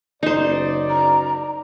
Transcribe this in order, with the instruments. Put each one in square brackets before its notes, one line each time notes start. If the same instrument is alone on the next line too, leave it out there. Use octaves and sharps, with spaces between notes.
[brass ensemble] F#1 D5 [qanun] D#4 C5
[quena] A#5